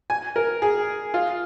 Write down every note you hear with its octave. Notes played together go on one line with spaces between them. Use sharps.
G#5
A#4
G#4
F4